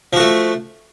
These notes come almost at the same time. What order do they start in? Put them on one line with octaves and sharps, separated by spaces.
F3 F#4 A3